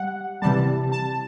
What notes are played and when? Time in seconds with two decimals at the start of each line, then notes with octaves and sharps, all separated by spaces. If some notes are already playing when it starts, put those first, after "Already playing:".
Already playing: G3 F#5
0.42 C3 E3 G3 A5
0.92 A5